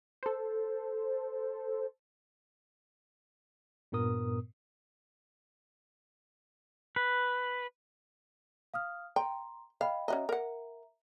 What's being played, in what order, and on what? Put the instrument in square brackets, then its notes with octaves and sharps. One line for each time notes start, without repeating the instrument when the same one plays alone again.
[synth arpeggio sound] A4 C5
[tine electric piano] G2 A#2 B3 A#4 D#6
[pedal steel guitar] B4
[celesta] F5 D#6 F6
[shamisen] G5 [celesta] A#5 C6
[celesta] D#5 G5 B5 [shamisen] F5
[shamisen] C#4 F#4 D#5 [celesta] E5 A#5
[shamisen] A#4 F#5